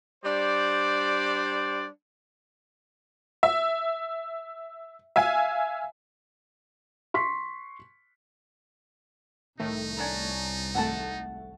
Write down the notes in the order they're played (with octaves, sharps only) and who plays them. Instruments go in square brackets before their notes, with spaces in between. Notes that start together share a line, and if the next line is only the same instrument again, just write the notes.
[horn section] G3 D4 C5 D5
[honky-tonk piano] E5
E5 F5 G#5
[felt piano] C6 C#6 B6
[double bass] C2 [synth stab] A2 D#3 A3 [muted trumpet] D#4
[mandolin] C#4 D4 A#5
[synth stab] G#1 A3 [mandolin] F#5 G#5 A5